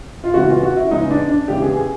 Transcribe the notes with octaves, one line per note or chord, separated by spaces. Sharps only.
F4
C#3 E3 G#3 B3 F#4
F4
F#4
E4
C#3 E3 G#3 B3 D#4
D4
D4
C#3 E3 G#3 B3 G4
G#4
G#4